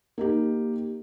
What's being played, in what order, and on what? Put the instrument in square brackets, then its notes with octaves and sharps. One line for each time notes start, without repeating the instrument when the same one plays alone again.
[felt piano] A#3 D#4 G4